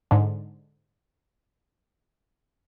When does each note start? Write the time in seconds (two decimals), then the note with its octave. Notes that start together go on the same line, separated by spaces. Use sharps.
0.11 G#2 D3